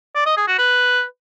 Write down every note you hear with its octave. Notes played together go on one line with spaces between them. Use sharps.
D5
D#5
G#4
F#4
B4